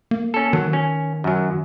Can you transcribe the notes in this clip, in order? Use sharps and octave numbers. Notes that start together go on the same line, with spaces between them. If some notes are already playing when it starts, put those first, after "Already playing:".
A#3
C#4 A4
D#3 F#3
C#4
F#2 F#3